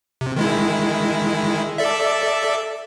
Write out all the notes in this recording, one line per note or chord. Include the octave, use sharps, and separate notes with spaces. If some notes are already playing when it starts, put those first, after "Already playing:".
C3
D#3 G#3 E4
A4 D5 E5